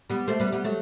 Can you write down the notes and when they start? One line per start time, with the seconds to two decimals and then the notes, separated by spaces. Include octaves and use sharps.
0.10 G3 B3
0.28 A3 C4
0.40 G3 B3
0.52 G3 B3
0.64 F#3 A3